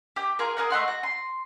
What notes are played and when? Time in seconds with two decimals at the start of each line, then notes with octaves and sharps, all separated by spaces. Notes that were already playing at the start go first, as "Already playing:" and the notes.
0.16 G4 G5
0.39 F4 G#4 A#4
0.57 G#4 A#4 F#5
0.70 A3 D#5 F#5 C6
0.88 F#4
1.03 C6